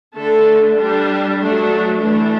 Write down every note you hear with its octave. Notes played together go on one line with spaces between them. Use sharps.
D3 A3 D4 A4
G3 D4
F#3 A3 D4
E3 A3 D4